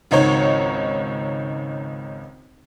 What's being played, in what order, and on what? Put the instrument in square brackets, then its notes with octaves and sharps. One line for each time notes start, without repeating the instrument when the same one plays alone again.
[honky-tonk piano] G#1 C#2 D#4 C#5